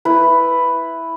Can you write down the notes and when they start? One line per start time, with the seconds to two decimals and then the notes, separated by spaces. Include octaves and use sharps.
0.05 E4 B4